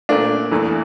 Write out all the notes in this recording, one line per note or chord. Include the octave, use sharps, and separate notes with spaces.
A#2 A3 D4
E2 E3 A3